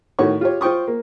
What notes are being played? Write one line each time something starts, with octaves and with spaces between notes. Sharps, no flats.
A2 D#3 F#4 C#5 C#6
F4 G4 C#5
F4 C5 G5 C#6 D#6
A#3